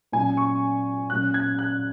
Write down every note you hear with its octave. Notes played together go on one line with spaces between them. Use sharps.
A#2 F#3 C#4 G#5
C#6
A#2 F#3 C#4 F#6
G#6
F#6